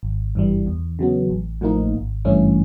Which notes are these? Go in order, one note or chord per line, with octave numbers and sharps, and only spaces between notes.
G#1
G2 E3 G3
E2
C#3 F#3 B3
A1
A2 F3 A#3 D#4
G#1
G2 E3 A3 C#4